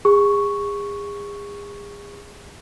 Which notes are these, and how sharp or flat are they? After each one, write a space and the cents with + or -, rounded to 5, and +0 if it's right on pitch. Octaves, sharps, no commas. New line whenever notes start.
G#4 -35 C#6 +0